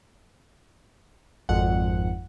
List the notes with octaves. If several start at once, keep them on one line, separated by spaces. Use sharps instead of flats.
G#1 F2 F#5